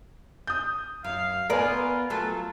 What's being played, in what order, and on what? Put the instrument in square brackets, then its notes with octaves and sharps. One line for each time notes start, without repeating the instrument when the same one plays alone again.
[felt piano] D#6 G6
[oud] F#2 [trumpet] F5
[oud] B3 D5 [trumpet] F4 [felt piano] A#4 G#5
[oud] F#3 A3 F4 [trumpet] A4